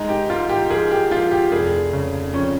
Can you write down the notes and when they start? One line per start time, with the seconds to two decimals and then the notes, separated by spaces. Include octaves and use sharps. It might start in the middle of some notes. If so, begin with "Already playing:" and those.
Already playing: G#3 D#4
0.09 G4
0.29 G#2 F4
0.49 G4
0.70 F3 G#4
0.91 G4
1.11 F3 F4
1.31 G4
1.52 F1 G#4
1.93 C#3
2.34 F2 C#4